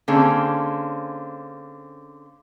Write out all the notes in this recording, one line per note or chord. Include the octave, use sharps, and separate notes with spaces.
D3 A#3 C4 C#4 G#4